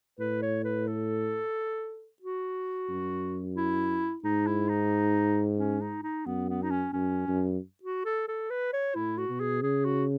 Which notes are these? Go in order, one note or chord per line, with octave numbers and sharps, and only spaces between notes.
A2 B4
C#5
B4
A4
F#4
F#2
E4
G#2 D#4
E4
D#4
C#4
D#4
D#4
F#2 B3
B3
D#4
C#4
F#2 C#4
F#2
F#4
A4
A4
B4
C#5
A2 E4
F#4
B2
G#4
C#3 G#4
F#4